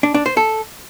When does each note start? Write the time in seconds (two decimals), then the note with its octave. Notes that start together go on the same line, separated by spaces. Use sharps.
0.03 D4
0.14 D4
0.26 C5
0.37 A4